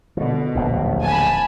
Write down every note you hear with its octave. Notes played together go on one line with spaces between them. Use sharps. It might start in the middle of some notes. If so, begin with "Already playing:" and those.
B2 D3 E3
D1 A#1 D#2
G#5 A5 B5